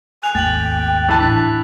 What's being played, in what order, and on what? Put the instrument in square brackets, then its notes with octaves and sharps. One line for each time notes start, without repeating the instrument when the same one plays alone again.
[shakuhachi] G#5 [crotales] F#6 F7
[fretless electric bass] G#1 D#2 A3 [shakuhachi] G5 [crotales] A6 F7 F#7
[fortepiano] E3 A5
[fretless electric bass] A2 D4 [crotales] B6